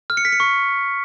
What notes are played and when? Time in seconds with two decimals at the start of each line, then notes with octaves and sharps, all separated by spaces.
0.10 F6
0.17 C#7
0.25 B6
0.32 C#7
0.40 C#6